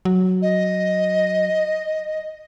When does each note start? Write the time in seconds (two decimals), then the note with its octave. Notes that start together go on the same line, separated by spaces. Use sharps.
0.05 F#3
0.42 D#5